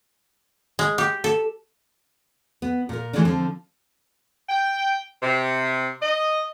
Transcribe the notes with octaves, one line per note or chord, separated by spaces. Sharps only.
G#3
G4
A4
B3
A#2 A#4
E3 G#3 A3 C#4 D4
D3 F3 C4
G5
C3
D#5